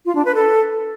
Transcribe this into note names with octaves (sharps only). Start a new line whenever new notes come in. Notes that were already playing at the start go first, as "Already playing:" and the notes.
F4
D4
B4
A4